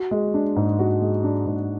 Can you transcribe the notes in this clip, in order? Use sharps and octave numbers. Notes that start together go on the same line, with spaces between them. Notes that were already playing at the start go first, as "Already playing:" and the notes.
Already playing: F#4
G#3
D4
G#2
F#4
G#3
D4
G#2